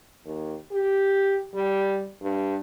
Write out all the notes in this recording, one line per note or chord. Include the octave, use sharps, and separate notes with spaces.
D#2
G4
G3
G2